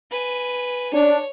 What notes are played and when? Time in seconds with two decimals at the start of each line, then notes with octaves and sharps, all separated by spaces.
0.11 B4 G#5
0.93 D4 C#5